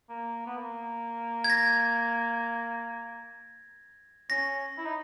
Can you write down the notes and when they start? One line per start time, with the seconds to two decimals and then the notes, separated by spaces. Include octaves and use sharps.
0.09 A#3
0.47 B3
0.56 A#3
1.44 G#6
1.50 A#6
4.30 C#4 A#6
4.77 E4
4.86 D#4